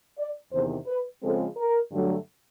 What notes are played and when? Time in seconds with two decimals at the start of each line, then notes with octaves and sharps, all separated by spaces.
0.19 D5
0.52 E2 C3 D#3 C5
0.87 B4
1.22 C#3 F3 G#3 C4 A4
1.57 A#4
1.91 G2 D3 F#3 A3